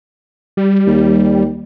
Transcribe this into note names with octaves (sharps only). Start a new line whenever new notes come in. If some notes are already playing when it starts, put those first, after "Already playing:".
G3
D#2